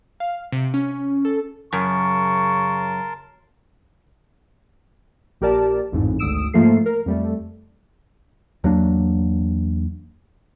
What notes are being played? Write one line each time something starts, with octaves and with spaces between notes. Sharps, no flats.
F5
C3
C#4
A4
F#2 C#3 A#4 A5 C6 C#6
A#1 G4 A#4 D5 A5
A1 F2 G#2
G#1 D2 D#6 E6 D7 E7
G#2 F3 A3 A#3 A4 C7
A#4
F2 G3 A3
E2 F#3 A#3 D4